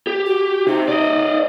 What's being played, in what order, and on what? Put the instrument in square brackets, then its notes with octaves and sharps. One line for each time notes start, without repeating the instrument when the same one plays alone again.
[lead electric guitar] G4
[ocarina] F#4
[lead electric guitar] C3 [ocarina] D#4
[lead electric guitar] D5 D#5